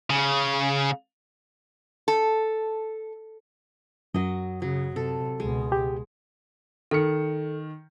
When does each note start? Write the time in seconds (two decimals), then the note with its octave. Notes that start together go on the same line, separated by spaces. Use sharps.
0.10 C#3
2.08 A4
4.14 F#2 F#3 D#5
4.62 C#3 F#3
4.96 C3 A4
5.40 C#2 B2 G#3
5.72 G4
6.91 D#3 A4 C#7